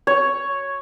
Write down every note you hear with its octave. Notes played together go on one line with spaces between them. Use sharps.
C#5